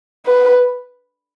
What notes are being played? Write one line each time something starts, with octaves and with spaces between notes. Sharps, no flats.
B4